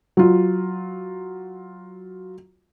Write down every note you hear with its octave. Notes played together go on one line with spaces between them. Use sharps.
F#3 F4